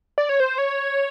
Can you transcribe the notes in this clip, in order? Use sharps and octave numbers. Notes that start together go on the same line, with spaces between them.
D5
C#5
C5
C#5